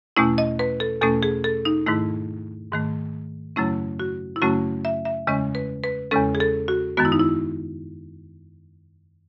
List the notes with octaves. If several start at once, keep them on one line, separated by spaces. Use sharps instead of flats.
E2 B2 A3 C#4 E4
D#5
B4
A4
E2 B2 A3 C#4 A4
G#4
A4
D#4
G#2 D#3 A3 E4
G#2 D#3 A3
F#2 C#3 F#3 A3 C#4 E4
F#4
E4
F#2 C#3 F#3 A3 C#4 F#4
E5
E5
E2 C#3 G#3 C#4 D#5
B4
B4
E2 C#3 G#3 C#4 A4
G#4
A4
F#4
F#2 D#3 G#3 B3 F#4
E4
D#4
E4